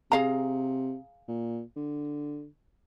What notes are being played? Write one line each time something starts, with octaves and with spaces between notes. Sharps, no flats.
C3 G#4 F5 A#5
A#2
D3